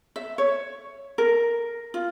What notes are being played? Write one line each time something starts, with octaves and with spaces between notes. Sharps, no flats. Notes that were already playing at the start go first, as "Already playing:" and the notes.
E5
C#5
A#4
F4